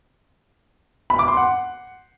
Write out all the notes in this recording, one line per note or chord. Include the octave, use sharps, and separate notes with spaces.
B5
D6
C6
F#5